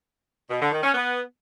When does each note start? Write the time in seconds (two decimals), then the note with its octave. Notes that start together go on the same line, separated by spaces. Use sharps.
0.50 B2
0.61 D3
0.72 D#3
0.83 C#4
0.94 B3